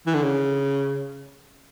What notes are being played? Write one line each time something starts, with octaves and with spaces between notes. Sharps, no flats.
E3
D3
C#3